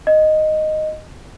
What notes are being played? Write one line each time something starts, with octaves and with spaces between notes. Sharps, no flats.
D#5